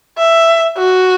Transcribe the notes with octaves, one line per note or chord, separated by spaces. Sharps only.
E5
F#4